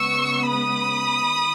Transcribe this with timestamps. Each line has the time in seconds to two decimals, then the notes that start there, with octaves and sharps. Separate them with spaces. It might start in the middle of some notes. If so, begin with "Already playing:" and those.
Already playing: C#3 G#3 B3 C#6 E6
0.49 B5 D#6
1.24 D#3